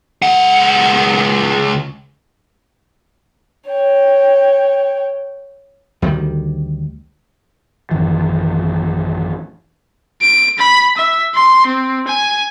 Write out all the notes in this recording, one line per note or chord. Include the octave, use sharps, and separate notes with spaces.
C#2 F#5
C#5 G5
D2 D#3 F#3 G3
A1 F#2 D#3 E3
D7
B5
E5
C6
C4
G#5